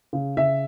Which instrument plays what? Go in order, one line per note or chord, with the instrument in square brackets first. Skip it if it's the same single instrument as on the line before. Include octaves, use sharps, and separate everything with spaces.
[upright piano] C#3
C#3 E5